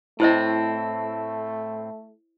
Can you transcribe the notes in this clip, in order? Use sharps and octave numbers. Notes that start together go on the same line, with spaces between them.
A2 A3 C4 E4 C5 D#5